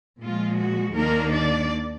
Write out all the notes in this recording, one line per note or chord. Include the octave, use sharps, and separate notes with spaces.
A#2 F3 G#3 F4
F#4
D#2 D#3 A#3 D4 A#4
D5